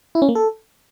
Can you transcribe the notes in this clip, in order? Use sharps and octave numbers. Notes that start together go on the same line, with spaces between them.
E4
C#4
A#3
A4